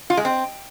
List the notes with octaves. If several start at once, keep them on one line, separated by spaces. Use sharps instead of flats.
F4
G#3
C4